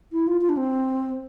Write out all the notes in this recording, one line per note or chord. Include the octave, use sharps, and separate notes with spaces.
E4
F4
F4
D4
C4